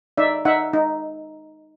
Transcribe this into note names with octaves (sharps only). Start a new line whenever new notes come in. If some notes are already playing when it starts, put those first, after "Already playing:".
D#4 D5 E5
D#4 E5 F#5
D#4